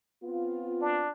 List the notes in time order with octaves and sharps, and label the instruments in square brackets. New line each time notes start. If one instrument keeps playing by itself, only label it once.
[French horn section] B3 C4 F4
[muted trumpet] D4